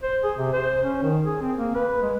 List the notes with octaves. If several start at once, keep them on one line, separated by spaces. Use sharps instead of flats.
C5
G#4
C3
C5
C#4
D#3
G#4
C4
A#3
B4
G#3